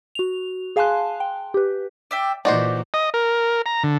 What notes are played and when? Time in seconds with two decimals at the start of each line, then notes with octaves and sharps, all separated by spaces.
0.15 F#4 F7
0.76 G#4 F5 G#5 A5 C6 F#6
1.20 G5
1.54 G4 B4
2.11 D5 E5 G5
2.45 A#2 E3 D#4 F#4 C5 D5 D6
2.94 D#5
3.14 A#4
3.66 A#5
3.83 D3